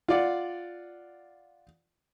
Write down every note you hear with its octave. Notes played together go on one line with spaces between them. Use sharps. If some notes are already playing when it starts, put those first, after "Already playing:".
F4 D5 F#5